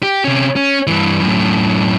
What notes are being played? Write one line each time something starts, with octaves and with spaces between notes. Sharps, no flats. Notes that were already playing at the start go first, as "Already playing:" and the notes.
G4
C3 C#4
C#4
G2 E3
F#2 A2